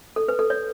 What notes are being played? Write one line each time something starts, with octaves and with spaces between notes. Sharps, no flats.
A4
B4
A4
C#5